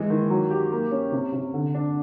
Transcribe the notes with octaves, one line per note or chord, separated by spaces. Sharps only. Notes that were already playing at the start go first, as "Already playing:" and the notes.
Already playing: E3 G#3
D#3
F#3
G4
A#3
C#4
C3
C3
D3
D4